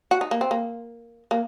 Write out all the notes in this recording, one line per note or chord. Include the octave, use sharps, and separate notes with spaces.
F#4
D#4
A#3
C4
A#3
A#3